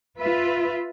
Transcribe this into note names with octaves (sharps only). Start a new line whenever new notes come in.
F4 B4 E5